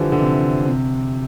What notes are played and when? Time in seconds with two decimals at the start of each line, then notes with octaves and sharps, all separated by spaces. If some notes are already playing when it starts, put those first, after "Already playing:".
Already playing: D3 E3 F3 G3
0.12 D3
0.20 C3
0.66 C3